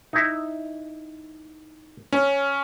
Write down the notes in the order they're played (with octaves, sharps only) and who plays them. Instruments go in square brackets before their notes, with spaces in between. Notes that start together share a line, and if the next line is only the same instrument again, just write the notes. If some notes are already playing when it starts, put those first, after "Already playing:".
[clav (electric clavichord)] D#4 E4
[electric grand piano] C#4